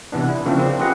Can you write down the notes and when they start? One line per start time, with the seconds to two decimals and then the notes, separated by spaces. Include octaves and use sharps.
0.12 C3 E3 B3 D4
0.29 E4
0.45 C#3 F3 A#3 C4 D4
0.59 C4
0.79 F4 G4 G#4 B4 D#5 F#5